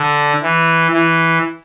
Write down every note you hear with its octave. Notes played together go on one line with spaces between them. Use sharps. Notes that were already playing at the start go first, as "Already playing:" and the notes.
Already playing: D3
E3
E3